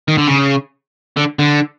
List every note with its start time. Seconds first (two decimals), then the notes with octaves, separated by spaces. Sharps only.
0.08 D#3
0.18 D3
0.28 C#3
1.17 D3
1.39 D3